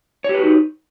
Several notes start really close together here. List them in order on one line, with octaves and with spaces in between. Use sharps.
C#5 G4 B4 F#4 D#4